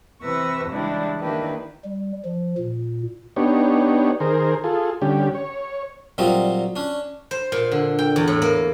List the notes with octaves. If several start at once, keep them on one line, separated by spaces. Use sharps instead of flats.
C3 E3 B4 C#6 E6 A#6
C#3 E3 G3 G#3 D4 E4
D#3 A#3 D4 E4 G4 B4
G3
F3
A#2
B3 D4 D#4 G4 C#5
D#3 G#4 A#4 C5
F4 G#4 A4
D3 G3 C#4 G4
C#5
A#2 F#3 G3 C4 D#4
C#4 D4
C5
A#2
D3
G5
E2
A2
A#3